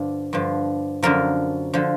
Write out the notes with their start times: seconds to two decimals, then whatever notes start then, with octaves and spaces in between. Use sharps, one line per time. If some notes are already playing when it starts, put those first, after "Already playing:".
Already playing: G2 D3 F3
0.33 G2 D3 F3
1.03 F#2 D3 F3 A#4
1.74 D3 F3